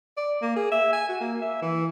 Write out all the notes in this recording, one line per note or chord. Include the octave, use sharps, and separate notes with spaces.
D5
A#3
G#4
E5
G#5
F#4
A#3
E5
E3